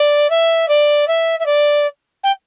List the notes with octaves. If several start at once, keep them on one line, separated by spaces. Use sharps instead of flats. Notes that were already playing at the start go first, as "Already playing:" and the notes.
Already playing: D5
E5
D5
E5
E5
D5
G5